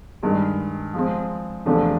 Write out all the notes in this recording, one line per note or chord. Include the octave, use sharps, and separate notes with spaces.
G2 D#3 G#3
F3 G#3 C4
E2 C3 F3 A3 D4